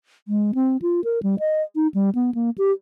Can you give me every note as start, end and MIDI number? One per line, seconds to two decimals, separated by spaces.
0.28 0.52 56
0.55 0.77 60
0.82 1.01 65
1.04 1.22 70
1.23 1.35 55
1.39 1.62 75
1.76 1.87 63
1.94 2.10 55
2.15 2.31 59
2.35 2.50 58
2.58 2.71 67